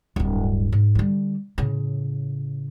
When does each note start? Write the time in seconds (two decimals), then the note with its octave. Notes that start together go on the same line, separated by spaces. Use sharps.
0.16 D1 G2
0.72 G#2
0.95 D3 G3
1.58 A2 C#3